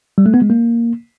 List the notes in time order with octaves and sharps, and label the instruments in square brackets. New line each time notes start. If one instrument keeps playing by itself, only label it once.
[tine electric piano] G3
A3
B3
G#3
A#3